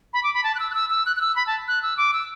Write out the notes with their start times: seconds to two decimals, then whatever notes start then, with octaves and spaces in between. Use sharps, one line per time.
0.13 B5
0.23 D6
0.34 B5
0.44 A5
0.55 F#6
0.59 E6
0.71 F#6
0.74 E6
0.90 E6
1.06 F#6
1.16 F#6
1.21 E6
1.36 B5
1.47 A5
1.68 F#6
1.83 E6
1.97 D6
2.14 E6